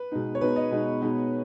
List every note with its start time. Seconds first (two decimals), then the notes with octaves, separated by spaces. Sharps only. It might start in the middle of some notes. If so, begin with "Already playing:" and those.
Already playing: B4
0.12 B2 G#3 B3 D#4
0.35 C#5
0.41 B2 G#3 B3 D#4 B4
0.56 D#5
0.71 B2 G#3 B3 D#4
1.01 B2 G#3 B3 D#4